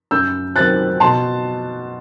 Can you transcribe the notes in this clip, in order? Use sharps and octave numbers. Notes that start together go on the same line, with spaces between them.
F#2 E6 G6
D#3 F#3 C4 F#6 A6
B2 A5 C6